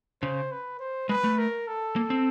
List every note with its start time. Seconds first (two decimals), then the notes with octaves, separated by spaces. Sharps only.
0.22 C#3 C5
0.51 B4
0.80 C5
1.09 G#3 B4
1.24 A3
1.38 A#4
1.67 A4
1.96 A#3
2.10 C4